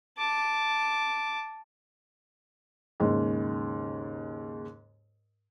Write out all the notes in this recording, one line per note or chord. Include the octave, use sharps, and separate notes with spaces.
A5 D6
D#2 G#2 C#3